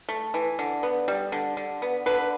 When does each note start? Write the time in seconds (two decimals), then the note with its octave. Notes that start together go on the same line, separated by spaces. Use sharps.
0.08 A3
0.34 E3
0.59 D3
0.83 B3
1.08 G3
1.32 D3
1.57 D3
1.82 B3
2.06 D3 B4